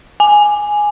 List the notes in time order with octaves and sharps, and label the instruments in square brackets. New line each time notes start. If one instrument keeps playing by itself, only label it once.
[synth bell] G#5